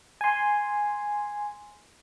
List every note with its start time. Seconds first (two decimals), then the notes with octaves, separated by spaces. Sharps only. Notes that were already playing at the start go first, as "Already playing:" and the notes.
0.21 G#5 C6